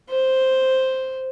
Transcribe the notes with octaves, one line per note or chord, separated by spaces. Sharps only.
C5